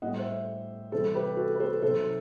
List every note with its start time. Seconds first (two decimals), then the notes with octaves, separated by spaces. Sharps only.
0.02 A2 G3 D#5 F#5
0.17 C5 E5
0.92 C3 E3 G3 A4 C5
1.15 G4 B4
1.37 F#4 A4
1.55 B4
1.60 A4 C5
1.82 C3 D#3 F#3 A4 C5